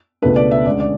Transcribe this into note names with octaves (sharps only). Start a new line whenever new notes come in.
C#2 B2 A3 D4 B4
D5
E5
D2 D3 G#3 C#4 D5
D5